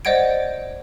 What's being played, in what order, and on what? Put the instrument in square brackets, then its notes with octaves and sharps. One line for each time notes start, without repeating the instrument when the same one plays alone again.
[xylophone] C5 D5 D#5 F#5 G#6 D7